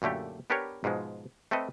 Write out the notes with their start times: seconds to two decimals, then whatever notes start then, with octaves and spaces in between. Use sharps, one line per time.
0.02 F#2 A#2 D3 A3 G4
0.50 B3 D4 G4 A#4 B4 C#5
0.84 G#2 B2 F3 G#3
1.51 A3 C4 A4 B4 D#5